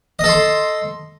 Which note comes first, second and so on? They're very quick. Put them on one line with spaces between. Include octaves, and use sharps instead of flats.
D#5 A4 C6